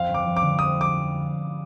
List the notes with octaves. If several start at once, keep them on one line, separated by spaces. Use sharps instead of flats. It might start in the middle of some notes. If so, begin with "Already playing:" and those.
Already playing: F2 F5
G1
D6
F3
D6
D3
F2 D#6
D6